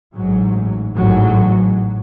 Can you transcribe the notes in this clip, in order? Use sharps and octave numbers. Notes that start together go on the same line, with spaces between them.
G#2 F#3
A1
A1 G#2 F#3